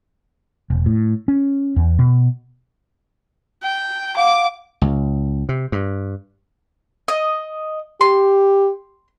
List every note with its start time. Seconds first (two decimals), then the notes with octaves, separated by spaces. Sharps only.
0.70 E1
0.86 A2
1.28 C#4
1.76 E2
1.99 B2
3.63 G5
4.17 F5 F#5 D6
4.81 C#2
5.49 C3
5.72 G2
7.08 D#5
8.01 G4 C6